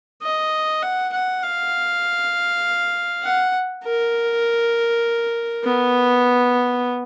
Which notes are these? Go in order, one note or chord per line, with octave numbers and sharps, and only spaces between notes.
D#5
F#5
F#5
F5
F#5
A#4
B3